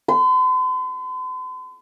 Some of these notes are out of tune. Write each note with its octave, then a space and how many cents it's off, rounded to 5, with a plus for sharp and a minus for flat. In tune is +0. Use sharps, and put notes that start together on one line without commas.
C6 -45